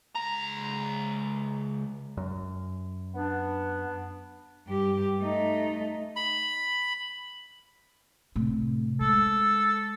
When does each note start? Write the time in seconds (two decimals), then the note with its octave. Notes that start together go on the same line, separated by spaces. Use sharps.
0.15 C#2 A#5
2.17 F#2
3.15 B3 D4
4.67 G2 G4
5.21 A3 D#4
6.16 B5
8.36 A2 C3
9.01 G#3 A4